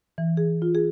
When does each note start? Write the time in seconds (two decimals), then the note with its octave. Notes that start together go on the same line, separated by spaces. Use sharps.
0.18 E3
0.37 G#4
0.62 F4
0.75 G#4